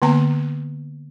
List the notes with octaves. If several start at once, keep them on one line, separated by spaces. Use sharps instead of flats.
D3 A#3 B3 A#5